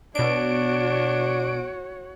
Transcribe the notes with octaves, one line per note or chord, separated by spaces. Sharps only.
B2 D4 F#4 C#5 D7